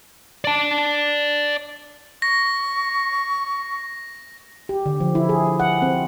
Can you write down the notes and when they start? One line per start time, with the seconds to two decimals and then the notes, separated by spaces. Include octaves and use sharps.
0.44 D5 A5
2.22 C#6 A#6
4.69 G4
4.86 D3
5.00 F3
5.15 E4
5.29 G#4
5.60 F#5
5.82 C4